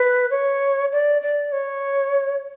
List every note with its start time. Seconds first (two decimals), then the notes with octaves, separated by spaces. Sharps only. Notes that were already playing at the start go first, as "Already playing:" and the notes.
Already playing: B4
0.31 C#5
0.92 D5
1.22 D5
1.52 C#5